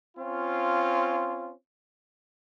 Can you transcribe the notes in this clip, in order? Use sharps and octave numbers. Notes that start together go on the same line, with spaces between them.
C4 C#4 F4